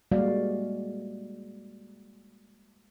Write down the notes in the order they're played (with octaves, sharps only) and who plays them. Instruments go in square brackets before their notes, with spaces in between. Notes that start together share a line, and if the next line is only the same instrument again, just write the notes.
[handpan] G3 G#3 A#3 F#4 D5 F5